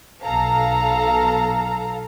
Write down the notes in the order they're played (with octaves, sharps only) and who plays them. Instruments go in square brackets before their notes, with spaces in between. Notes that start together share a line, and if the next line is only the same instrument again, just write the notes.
[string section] B1 A4 F5 A#5